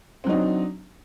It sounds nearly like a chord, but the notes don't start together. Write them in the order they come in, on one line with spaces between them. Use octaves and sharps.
C4 F#3 D#4 D4